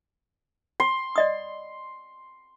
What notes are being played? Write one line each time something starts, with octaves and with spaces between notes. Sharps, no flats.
C6
D5 D#5 D#6